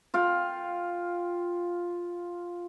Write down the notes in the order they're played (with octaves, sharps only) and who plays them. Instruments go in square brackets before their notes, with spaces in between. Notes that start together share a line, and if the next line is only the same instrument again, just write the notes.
[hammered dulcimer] F4 F5 G5